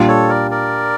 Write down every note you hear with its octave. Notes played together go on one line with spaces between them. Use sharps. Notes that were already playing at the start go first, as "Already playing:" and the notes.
Already playing: A#2 G3 D4 F4
A4 C#5
A#4 D5
A#4 D5